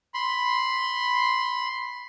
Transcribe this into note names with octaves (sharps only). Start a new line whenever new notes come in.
B5 C6